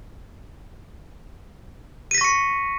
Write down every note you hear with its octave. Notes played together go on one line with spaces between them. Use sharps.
C#6 A#6 B6 C#7 D#7